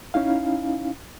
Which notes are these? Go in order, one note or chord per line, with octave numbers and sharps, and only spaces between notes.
C#4 D#4 E4 F5